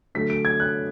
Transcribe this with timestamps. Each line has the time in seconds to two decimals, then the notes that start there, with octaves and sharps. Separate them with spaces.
0.15 D3 F#3 A3 B6
0.30 D7
0.45 G#6
0.60 F#6